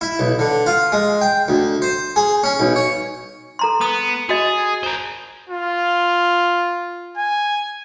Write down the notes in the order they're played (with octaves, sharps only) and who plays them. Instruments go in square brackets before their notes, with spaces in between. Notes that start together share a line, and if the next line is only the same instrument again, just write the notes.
[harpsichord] E4
B1
D3
F4
G#3
G5
D2
C5
G#4
C#4
B1
C#5
[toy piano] A4 A#5 C6
[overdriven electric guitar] B3 [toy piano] D#6
[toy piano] F#4 D#5 [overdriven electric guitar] G#4
[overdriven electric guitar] A#4 C5
[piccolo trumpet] F4
G#5